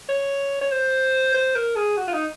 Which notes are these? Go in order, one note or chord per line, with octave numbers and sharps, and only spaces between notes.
C#5
C#5
C5
C5
A#4
G#4
F#4
F4
D#4